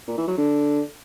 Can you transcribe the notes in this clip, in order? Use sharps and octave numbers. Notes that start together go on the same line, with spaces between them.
A#2
E3
F#3
D3